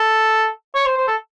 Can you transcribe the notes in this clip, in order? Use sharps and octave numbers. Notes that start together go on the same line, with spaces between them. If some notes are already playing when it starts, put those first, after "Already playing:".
Already playing: A4
C#5
C5
C5
A4